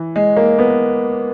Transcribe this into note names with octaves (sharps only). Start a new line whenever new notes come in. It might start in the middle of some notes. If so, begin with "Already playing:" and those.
Already playing: E3
G#3
A#3
B3